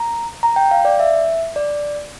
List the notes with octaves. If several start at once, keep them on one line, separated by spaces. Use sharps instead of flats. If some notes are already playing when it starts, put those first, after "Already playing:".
Already playing: A#5
A#5
G5
F5
D5
E5
D5